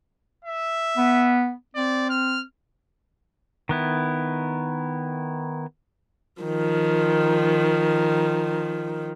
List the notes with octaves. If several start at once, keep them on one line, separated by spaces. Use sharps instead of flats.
E5
B3
C4 D5
F6
D#3 B3 E4
D#3 F3